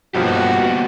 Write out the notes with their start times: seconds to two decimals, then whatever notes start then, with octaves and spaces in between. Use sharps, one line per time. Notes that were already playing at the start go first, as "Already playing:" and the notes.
0.15 B1 G2 F3 A#3 B3 F#4 G4